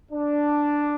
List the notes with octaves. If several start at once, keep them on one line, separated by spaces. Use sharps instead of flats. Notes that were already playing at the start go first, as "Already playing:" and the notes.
D4